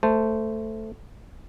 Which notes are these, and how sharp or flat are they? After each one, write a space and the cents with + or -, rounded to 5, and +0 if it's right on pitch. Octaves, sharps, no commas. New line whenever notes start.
A3 +0 C5 -15 A5 +0